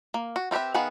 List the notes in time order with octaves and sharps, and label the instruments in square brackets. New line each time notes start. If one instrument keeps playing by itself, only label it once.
[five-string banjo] A#3
F#4
C4 F4 G4 B4 E5
D#3 B3 G#4 F5 F#5